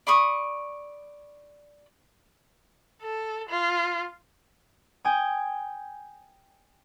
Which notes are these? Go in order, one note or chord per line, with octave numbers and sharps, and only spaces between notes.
D5 B5 C#6 D#6
A4
F4
G5 G#5 D#6